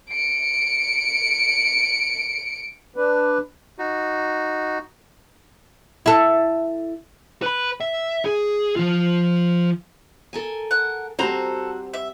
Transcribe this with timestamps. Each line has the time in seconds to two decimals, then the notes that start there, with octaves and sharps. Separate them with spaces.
0.11 C#7 D7
2.96 D4 B4
3.78 D#4 F#4
6.06 E4 A4
7.42 B4 B5
7.80 E5
8.25 G#4
8.76 F3 F4
10.33 A4 A#4 G#5
10.71 F#5
11.19 G3 C4 F#4 A4 C5 A#5
11.94 E5